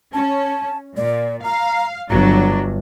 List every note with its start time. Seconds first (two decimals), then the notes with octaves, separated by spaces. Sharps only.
0.13 C#4 A5
0.97 A#2 D5
1.44 F5 A#5
2.10 G1 F#3 D4 A#5